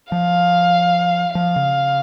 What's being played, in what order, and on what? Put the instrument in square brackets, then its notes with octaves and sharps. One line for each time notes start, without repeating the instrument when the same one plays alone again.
[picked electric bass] F3 [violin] F5
[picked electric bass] F3 [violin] F5
[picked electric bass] C#3